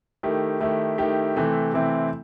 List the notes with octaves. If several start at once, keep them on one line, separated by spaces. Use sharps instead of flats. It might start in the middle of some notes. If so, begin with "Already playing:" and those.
D#3 A3 E4 G4
D#3 A3 E4 G4
D#3 A3 E4 G4
C3 E3 A3 C4 E4
C3 E3 A3 C4 E4